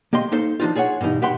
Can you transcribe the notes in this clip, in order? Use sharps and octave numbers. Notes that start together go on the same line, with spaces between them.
A#3 G4 D#5 C6
A#3 D#4 A4 C5
F3 D4 D#4 F4
F4 G#4 C#5 E5 F#5
G2 B2 E3 D#4
B2 G4 E5 F#5 B5 C6